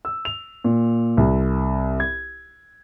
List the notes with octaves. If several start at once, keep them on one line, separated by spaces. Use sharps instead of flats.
E6
F7
A#2
C2
G#6